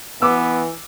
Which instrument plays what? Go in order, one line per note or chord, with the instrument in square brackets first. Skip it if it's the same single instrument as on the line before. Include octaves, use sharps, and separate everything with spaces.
[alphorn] E3 [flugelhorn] B3 [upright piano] D6 E6